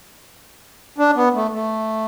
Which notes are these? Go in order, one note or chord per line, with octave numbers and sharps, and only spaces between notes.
D4
B3
A3
A3